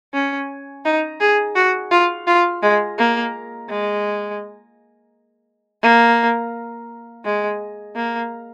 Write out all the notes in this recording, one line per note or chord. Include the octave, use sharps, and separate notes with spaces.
C#4
D#4
G#4
F#4
F4
F4
G#3
A#3
G#3
A#3
G#3
A#3